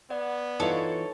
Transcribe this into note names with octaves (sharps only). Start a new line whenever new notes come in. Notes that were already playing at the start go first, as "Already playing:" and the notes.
B3 D5 F#5
E3 D#4 F4 A4 C#5